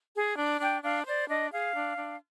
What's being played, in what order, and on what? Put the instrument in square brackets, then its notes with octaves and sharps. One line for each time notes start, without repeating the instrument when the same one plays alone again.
[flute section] G#4
D4
D4 G5
D4 F5
C5 D5
D4 D#5
G#4 F5
D4
D4